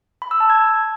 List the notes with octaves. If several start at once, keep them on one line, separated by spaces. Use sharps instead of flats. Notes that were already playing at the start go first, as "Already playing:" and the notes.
B5
E6
A5
G#6